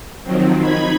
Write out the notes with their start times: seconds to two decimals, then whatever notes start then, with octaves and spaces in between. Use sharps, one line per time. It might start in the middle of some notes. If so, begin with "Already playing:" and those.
0.23 D#3 F3 F#3 C4
0.59 D#4 B5 G#6